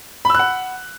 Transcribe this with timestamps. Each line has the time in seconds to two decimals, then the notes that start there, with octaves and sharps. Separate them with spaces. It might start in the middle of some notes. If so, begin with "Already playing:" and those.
0.25 B5
0.30 E6
0.35 F#6
0.39 F#5